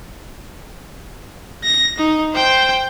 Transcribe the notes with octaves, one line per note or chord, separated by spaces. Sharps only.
A#6
D#4
C5 G5